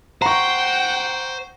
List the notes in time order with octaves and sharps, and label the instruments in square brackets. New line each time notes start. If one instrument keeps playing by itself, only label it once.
[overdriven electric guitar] C5 [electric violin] F#5 G5 [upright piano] A#5 C#6